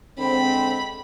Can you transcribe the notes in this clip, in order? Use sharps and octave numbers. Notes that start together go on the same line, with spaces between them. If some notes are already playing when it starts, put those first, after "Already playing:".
D3 G#3 C4 B5